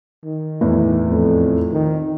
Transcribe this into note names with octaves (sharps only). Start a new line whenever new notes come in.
D#3
E2 A2 E3
F2
D#3